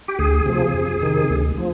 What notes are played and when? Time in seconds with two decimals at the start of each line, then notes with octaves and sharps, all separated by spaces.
0.08 G4
0.19 D2 G#4
0.46 C3 F3
0.74 F2
1.02 C3 D#3
1.30 D2
1.57 F3